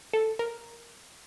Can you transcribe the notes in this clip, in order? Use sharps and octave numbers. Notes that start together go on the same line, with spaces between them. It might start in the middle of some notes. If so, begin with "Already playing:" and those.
A4
A#4